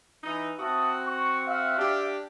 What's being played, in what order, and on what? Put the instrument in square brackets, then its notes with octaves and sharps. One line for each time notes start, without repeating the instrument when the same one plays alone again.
[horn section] E3 D#4
[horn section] C4 F#4 [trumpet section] E5 A5 D#6
[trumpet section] C#6
E5 F5
[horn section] D4 G4